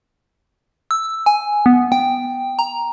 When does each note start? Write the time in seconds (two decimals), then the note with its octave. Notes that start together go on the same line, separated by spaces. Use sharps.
0.91 E6
1.26 G#5
1.66 B3
1.92 G5
2.59 A#5